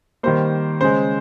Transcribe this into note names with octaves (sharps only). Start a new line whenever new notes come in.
D#3 G3 A#3 C5
C#3 G#3 C5